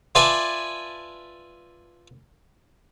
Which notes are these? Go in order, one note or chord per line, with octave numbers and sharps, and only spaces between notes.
F4 B4 D5 E5 G#5 A5